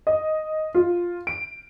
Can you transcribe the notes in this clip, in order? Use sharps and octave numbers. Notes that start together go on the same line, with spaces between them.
D#5
F4
D7